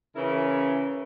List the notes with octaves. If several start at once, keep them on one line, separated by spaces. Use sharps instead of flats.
C#3 E3 C#4 E4 A#4